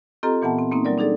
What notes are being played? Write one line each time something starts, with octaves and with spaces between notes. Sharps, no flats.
C4 F4 G4 A4 D#5 A#5
A#2 E3 B3 F#5 A5
C4
A#3 C4 C#4 D#4
F#3 G3 A#4 D5
D4 D#4 G#4 A4 D5